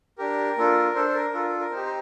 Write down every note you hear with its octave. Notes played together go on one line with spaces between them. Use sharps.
D4 G4 A#4
A#3 D4 F4 A4
D4 A4 C5
A4
A#4
D4 F4 A4 A#4
A4
A#4
C4 D#4 G4 C5
C5